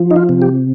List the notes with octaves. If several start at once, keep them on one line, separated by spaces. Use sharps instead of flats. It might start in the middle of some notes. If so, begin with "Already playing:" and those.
Already playing: F3
D#4
F4
C3
G4